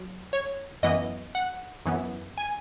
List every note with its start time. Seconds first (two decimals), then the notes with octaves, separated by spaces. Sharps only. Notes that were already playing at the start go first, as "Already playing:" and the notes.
Already playing: F#3
0.33 C#5
0.83 F#2 E3 B3 D#5
1.35 F#5
1.86 F#2 E3 B3
2.38 G#5